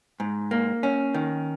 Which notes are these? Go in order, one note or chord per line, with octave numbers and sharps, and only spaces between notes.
G#2
A#3
C#4
D#3